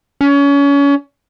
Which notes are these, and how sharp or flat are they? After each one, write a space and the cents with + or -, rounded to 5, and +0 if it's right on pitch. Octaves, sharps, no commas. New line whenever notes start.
C#4 +30